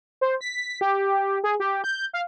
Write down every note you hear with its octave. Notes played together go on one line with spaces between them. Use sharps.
C5
B6
G4
G#4
G4
G6
F5